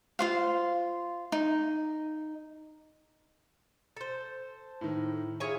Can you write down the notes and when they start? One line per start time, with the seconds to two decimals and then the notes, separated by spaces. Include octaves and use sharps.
0.19 F4 C5 F5
1.32 D#4
3.97 A4 C5
4.81 A2 D#3
5.40 E4 F4 G#4 C#5 G#5